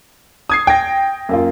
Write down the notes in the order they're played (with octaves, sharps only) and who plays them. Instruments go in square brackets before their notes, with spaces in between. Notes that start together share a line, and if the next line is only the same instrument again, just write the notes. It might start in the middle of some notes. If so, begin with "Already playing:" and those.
[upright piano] D#6 G#6 C7
G5 A#6
F#2 A#3 F4